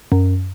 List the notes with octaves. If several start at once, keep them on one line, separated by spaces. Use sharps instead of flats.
F#2